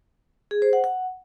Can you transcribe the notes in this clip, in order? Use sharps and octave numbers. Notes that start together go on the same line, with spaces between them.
G#4
C5
F#5
F#5